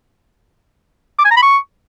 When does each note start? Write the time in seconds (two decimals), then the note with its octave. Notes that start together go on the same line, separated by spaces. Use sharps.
1.19 D6
1.25 G#5
1.31 A#5
1.36 B5
1.42 C#6